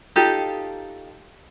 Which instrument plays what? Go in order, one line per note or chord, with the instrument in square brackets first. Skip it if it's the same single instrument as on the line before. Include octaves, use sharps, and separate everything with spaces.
[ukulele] D#4 F4 G4 A4